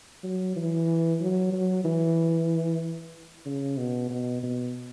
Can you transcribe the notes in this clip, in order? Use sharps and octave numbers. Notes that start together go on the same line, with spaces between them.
F#3
E3
F#3
F#3
E3
C#3
B2
B2
B2